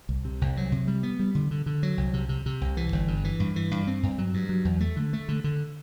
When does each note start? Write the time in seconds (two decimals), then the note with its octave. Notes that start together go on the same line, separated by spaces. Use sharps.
0.09 C2
0.25 C3
0.41 C2
0.57 F#3
0.72 C3
0.87 G3
1.03 B3
1.19 G3
1.35 D3
1.51 D3
1.66 D3
1.83 F#3
1.97 C2
2.14 C3
2.29 C3
2.46 C3
2.61 C2
2.77 E3
2.93 G1
3.08 G2
3.24 E3
3.40 G2
3.56 E3
3.71 G2
3.87 C4
4.03 G2
4.18 F#3
4.34 G2
4.49 F#3
4.65 E2
4.80 A3
4.96 D3
5.13 A3
5.29 D3
5.44 D3